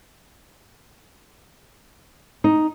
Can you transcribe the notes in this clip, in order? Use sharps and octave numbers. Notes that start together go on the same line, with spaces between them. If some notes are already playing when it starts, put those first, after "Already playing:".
D#4